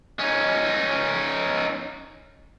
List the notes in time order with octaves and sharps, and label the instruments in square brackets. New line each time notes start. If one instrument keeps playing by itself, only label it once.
[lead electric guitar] C#4 D#4